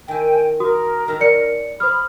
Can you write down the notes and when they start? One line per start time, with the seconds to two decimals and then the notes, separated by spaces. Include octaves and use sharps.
0.08 D#3 E4 G5 G#5
0.60 F#4 A#4 D#6
1.08 D#3 A4 A#5
1.21 C#4 D5 C#7
1.80 C5 B5 D#6 F6